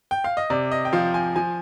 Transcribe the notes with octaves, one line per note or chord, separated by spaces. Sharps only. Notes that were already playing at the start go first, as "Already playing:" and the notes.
G5
F5
D#5
C3 D5
D#5
G5
F3 F5
G#5
F3 G#5